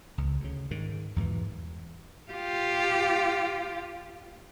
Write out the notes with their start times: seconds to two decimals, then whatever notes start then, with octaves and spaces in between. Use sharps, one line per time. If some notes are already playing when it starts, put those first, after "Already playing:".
0.18 C#2
0.40 D2 C#3
0.71 G#2 D#3
1.16 E2 G#2 B2 E3
2.31 F4 G4